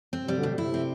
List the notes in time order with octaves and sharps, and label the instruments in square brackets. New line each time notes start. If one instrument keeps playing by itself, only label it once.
[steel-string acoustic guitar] C4
[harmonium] C3 [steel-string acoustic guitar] G3
[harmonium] B2 D3
[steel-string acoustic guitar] A2 [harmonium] C3
[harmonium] C3 [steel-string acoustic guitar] E4
[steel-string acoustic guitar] C4